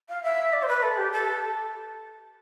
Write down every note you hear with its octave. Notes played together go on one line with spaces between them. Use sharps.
F5
E5
D5
C5
B4
A4
G4
A4